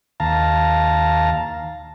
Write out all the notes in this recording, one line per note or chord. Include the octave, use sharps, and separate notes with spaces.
D#2 F5 A5 A#5